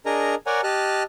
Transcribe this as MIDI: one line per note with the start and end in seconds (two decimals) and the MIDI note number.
0.06 0.35 62
0.06 0.35 68
0.06 0.35 70
0.06 0.35 75
0.06 0.35 82
0.46 0.61 70
0.46 0.61 73
0.46 0.61 74
0.46 0.61 78
0.46 0.61 80
0.46 0.61 82
0.63 1.03 67
0.63 1.03 75
0.63 1.03 81
0.63 1.03 89
0.63 1.03 90